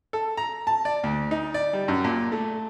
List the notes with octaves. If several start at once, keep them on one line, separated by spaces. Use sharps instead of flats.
A4
A#5
A5
D5
D2
D#4
D5
G3
F#2
A#2
A3